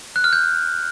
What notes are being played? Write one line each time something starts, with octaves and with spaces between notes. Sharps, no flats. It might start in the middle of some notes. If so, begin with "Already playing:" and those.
F#6
F6
G6